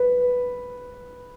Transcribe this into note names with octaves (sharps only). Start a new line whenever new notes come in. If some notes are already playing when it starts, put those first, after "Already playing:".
Already playing: B4